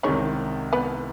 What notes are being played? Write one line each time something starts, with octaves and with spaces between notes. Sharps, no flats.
C2 C3 D#3 G#3 C#4 C#5
B3 B4